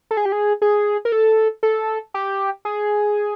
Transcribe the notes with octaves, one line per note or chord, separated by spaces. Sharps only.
A4
G#4
G4
G#4
G#4
A#4
A4
A4
G4
G#4